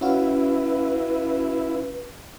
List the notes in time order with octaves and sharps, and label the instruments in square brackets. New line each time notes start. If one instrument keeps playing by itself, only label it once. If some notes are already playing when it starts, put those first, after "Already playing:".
[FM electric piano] C#4 F#4 F5 [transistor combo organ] E4 [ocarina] B4